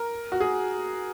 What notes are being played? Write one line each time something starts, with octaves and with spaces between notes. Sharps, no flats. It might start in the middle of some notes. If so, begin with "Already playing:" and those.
Already playing: A#4
F#4
G#4